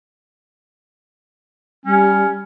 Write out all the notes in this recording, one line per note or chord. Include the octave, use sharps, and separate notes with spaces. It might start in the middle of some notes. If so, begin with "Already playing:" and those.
G3 C#4